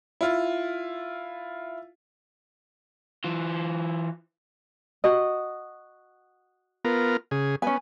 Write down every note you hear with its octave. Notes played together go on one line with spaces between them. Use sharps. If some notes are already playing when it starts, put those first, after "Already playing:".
E4 F4
E3 F4
F#4 D#5
B3 F4 A#4
C#3 G#4
B3 C#4 G#5